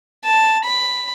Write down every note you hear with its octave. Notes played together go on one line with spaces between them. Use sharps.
A5
B5